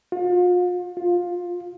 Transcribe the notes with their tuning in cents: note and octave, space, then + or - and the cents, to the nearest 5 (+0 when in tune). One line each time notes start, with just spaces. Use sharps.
F4 +40
F4 +15